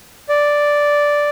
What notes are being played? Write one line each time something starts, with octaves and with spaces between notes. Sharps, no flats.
D5